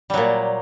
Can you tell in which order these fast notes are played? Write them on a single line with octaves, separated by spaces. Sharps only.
G3 F#3 A#2